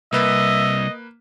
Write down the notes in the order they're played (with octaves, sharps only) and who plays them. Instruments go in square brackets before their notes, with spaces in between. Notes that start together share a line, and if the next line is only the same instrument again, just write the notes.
[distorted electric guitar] C2 [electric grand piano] A#3 B4 [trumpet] D#5 [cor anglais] E5